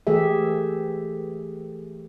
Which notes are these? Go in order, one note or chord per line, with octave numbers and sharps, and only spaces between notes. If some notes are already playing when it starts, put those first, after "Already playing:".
E3 A3 G4 G#4 E5